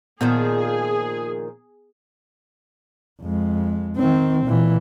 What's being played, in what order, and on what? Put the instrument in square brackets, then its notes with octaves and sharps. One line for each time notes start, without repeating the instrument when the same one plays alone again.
[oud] A#2 D#3 F3 [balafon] B3 [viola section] G#4
[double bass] F2 G#3
D#3 C4
A#2 E3